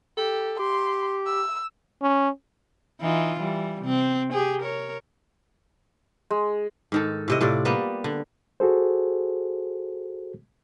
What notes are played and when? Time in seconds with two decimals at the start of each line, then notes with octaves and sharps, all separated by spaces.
0.18 G4 A4
0.59 G4 C6
1.26 E6
2.02 C#4
3.01 E3 D#4 F4
3.40 E3 G3
3.82 C3 C4
4.33 G4 G#4
4.62 A#4 C#5
6.31 G#3
6.92 G#2 D#3 A4
7.28 A2 C3 D#5
7.41 A2 C3 F4 D5
7.65 G3 A#3 B3
8.04 D3
8.60 F#4 G#4 A4 C5